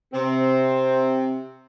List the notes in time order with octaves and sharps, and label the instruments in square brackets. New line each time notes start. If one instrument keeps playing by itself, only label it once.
[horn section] C3 C4